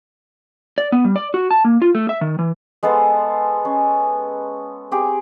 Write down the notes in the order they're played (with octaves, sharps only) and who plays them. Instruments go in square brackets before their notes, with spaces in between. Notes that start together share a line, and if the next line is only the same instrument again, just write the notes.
[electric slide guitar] D5
B3
G3
D5
F#4
A5
A#3
F4
A3
E5
D#3
E3
[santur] G#3 B3 A4 C5
C#4
C4 G4 G#4